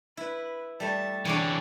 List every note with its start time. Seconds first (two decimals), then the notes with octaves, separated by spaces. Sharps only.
0.17 E4 B4
0.80 G3 A3 A5
1.25 D3 E3 D4 G#4 C#5 D5 G5